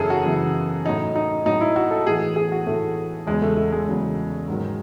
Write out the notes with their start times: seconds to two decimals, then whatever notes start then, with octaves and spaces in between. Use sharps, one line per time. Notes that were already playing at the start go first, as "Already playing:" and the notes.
Already playing: F#2 C#3 E3 G#4 A4
0.10 F#4
0.25 F#2 C#3 E3
0.84 A2 F#3 D#4
1.16 D#4
1.45 A2 F#3 D#4
1.61 E4
1.76 F#4
1.91 A4
2.06 A2 E3 G#4
2.36 G#4
2.52 F#4
2.66 A2 E3 A3
3.26 E2 C#3 F#3 G#3
3.42 A3
3.56 A3
3.72 G#3
3.88 E2 C#3 F#3
4.48 G#2 D#3 F#3